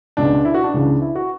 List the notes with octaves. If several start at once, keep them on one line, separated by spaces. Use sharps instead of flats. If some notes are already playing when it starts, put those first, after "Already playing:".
C#2 B2 D4
E4
F#4
D4
C#2 C#3 E3
E4
F#4